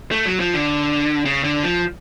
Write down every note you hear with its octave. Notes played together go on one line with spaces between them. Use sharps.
A3
F#3
F3
D3
C#3
D3
F3